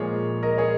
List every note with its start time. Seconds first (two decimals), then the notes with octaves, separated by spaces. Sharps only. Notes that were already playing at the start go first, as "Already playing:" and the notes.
Already playing: A#2 F3 G#3 G#4 C#5
0.43 A#4 D#5
0.58 G#4 C#5